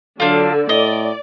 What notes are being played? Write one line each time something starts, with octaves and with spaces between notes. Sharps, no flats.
D3 F#3 D4 F4 A4
A2 D5 D#5